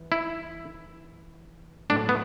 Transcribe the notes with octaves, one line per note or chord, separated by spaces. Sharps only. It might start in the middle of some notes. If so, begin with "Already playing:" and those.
Already playing: E3
E4
A2 F#3 A3 D4
B3